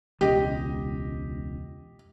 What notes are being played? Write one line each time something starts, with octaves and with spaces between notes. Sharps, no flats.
E1 C#2 G4 D#5